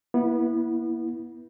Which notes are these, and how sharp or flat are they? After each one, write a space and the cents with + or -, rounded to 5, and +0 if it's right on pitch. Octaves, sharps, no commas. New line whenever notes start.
B3 -25 E4 +0